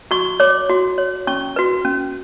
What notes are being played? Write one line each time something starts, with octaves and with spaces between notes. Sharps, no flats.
F#4 C#6
C#5 D6
F#4
C#5
C#4 C#6
F#4 B4
C#4